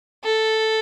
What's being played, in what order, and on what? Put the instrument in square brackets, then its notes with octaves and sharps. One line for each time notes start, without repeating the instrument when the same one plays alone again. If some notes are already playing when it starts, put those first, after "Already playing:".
[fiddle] A4